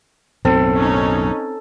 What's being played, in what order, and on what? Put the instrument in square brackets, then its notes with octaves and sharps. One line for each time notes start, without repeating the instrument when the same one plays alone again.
[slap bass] B1 F#2 A2 [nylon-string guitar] C4 [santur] A4
[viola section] C#4 D#4